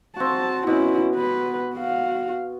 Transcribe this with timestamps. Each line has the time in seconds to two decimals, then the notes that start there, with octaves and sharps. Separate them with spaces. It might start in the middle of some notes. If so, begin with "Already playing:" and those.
0.16 C4 F#4 A5
0.67 B2 C#4 E4
1.16 B4
1.74 F#4 F5